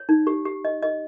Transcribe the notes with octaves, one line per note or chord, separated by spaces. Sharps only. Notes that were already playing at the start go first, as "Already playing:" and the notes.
Already playing: C#5
D#4
G4
G4
D#5
D#5